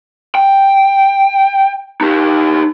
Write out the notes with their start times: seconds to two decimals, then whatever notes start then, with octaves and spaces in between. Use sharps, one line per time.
0.35 G5
2.01 D#4 G4